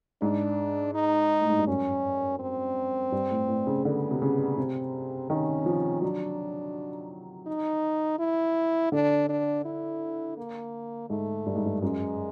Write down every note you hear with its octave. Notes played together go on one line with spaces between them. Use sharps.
G#2 D4
D#4
A2
G#2
G2
F#2 C#4
C4
G2
A2
A2
C#3
D3 B3
C3
C#3
C3 C4
D#3 C#4
F3
F#3 D4
D#4
E4
D3 D4
D4
E4
A#3
G#2 A3
G2
G#2
G2
F#2 G#3